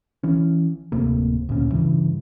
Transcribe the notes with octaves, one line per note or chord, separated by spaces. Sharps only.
E3 C#4
D1 C3 A3 A#3
D2 A#2 C#4
G2 C#3 E3